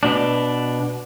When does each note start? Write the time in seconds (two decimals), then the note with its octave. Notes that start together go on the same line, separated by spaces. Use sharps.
0.03 B2 D4